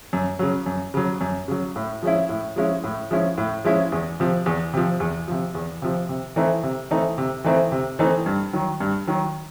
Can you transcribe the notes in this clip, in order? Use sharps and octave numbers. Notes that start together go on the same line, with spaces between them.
F#2
C#3 F#3
F#2
C#3 F#3
F#2
C#3 F#3
A2
F3 G#3 C#4 E4
A2
F3 G#3 C#4 E4
A2
F3 G#3 C#4 E4
A2
F3 G#3 C#4 E4
E2
C3 F3
E2
C3 F3
E2
C3 F3
E2
C3 F3
C3
E3 A3 C4 D#4
C3
E3 A3 C4 D#4
C3
E3 A3 C4 D#4
C3
E3 A3 C4 D#4
G2
D#3 F#3
G2
D#3 F#3